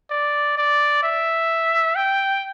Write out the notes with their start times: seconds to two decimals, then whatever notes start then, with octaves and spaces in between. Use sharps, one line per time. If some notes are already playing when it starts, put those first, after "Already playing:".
0.10 D5
0.58 D5
1.03 E5
1.96 G5